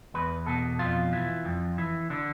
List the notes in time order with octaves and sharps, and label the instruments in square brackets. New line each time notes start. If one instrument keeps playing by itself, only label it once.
[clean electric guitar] E2 B4
B2 A4
F2 F4
E3
F2
E3
D3 D4